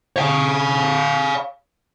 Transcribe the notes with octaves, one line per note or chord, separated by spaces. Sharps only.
C#5 F5